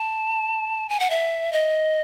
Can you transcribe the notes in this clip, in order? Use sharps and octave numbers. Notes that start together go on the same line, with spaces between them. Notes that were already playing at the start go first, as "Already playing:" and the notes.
Already playing: A5
G#5
F#5
E5
D#5